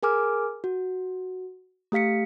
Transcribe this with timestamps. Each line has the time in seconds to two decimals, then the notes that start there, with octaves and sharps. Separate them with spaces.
0.03 G#4 A#4 G#5 D6 F6
0.64 F#4
1.92 A3 G4 F5 B6 C#7